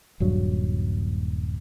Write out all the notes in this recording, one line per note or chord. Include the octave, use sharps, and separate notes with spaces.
D#1 G2 F#3